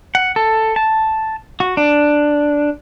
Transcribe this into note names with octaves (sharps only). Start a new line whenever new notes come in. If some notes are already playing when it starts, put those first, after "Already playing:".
F#5
A4
A5
F#4
D4